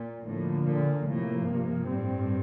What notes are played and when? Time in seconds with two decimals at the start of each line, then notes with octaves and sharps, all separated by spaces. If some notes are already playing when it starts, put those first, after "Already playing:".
Already playing: A#2
0.24 A2 D3 F3 A#3
0.65 A#2
1.06 A2 C3 F3 A#3
1.48 G2
1.89 A2 G3 C4